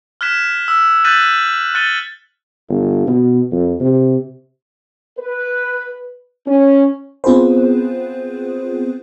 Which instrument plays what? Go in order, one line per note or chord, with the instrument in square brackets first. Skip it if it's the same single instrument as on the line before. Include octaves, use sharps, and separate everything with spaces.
[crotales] F6 F#6 G#6 B6 E7
E6
F#6 G6 A6 B6 D#7 F#7
F#6 A6 C#7 D#7 G7
[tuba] G1
B2
F2
C3
[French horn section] B4
C#4
[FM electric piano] B3 C4 F4 G#4 B4 C5